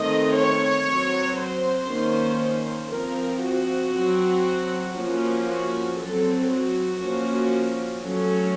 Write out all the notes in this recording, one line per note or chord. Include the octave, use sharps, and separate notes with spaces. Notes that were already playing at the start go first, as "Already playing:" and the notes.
Already playing: D#3 A3 C4 D#5
C#5
F#3 C4
C5
D#3 A#3 C#4
F3 C4 A#4
F#4
F#3 C4
F3 A#3 C#4
F#4
F#3 C4 A4
F#4
F3 A#3 C#4
F#3 A3 C#4